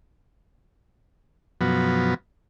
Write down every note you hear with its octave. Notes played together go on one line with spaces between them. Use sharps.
F#2 B2 F3 F#3 B3